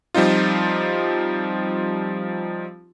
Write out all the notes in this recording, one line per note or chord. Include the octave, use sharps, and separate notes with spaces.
F3 G3 C4 D#4 F4